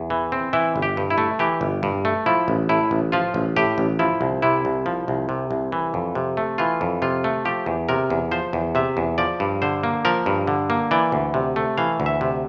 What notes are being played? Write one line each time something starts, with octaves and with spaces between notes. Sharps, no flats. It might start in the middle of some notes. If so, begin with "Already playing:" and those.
Already playing: E2
E3
C4
E3 E4
G1
G4
G2
E4
A3
E3 G4
G1
G2
A3
F3 E4
A1
A2 E4
A1
F3 F4
A1
A2 G4
A1
F3 E4
C2
C3 E4
C2
F3
C2
C3
C2
E3
F2
C3
A3
E3 F4
F2
C3 F4
A3
F3 G4
E2
C3 A#4
E2
F3 C5
E2
C3 E5
E2
F3 D5
G2
D3 C5
A#3
F3 A#4
G2
D3
A#3
E3 D5
D2
C3
A3
E3 F5
D2
E5
C3